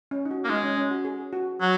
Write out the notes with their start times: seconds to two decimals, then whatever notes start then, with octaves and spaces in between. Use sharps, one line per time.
0.11 C#4
0.25 D#4
0.31 F#4
0.44 A#3
0.49 G#3 D#4
0.63 C#4
0.77 C#4
0.91 F#4
1.05 G#4
1.33 F#4
1.61 F#3